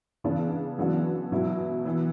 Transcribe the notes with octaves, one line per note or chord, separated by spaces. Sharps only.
C#3 E3 B3 D4
F#2 E3 B3 D4 F#4
B2 F#3 B3 E4
E3 B3